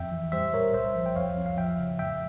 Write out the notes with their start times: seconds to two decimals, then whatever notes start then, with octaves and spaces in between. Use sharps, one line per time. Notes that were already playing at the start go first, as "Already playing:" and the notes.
Already playing: F2 E5 G5
0.12 E3
0.32 G3 C5 E5
0.53 G3 A#4 C#5
0.74 C2 C5 E5
0.95 F3
1.06 G5
1.16 F2 C#5 F5
1.37 F2
1.46 F5
1.57 F3 E5 G5
1.79 C#3
1.99 G#3 E5 G5